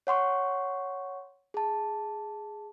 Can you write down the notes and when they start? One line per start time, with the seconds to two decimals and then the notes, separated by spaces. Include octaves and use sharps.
0.07 C#5 F#5 C6 C#6
1.54 G#4 A5